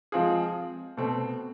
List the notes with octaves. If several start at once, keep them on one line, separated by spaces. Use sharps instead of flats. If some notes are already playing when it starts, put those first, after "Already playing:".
F3 G#3 C4 F4 G#4
B2 A3 C4